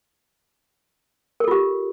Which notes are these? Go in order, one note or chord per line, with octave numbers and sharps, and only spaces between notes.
F4 G4 A4 A#4